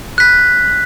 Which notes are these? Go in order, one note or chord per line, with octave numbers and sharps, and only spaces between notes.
F#6 B6